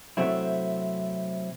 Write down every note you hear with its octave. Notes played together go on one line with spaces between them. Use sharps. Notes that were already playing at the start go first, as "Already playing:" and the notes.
C3 F#3 A3 C4 E4